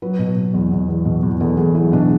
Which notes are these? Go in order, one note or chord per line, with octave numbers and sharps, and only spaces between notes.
F#3 B4
B2
B2
E2
E2
E2
B2
E2
E2 A4
E2 G#4
F#3 E4
B2 D4